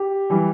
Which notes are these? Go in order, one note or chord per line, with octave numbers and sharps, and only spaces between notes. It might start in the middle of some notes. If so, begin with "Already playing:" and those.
Already playing: G4
E3 G3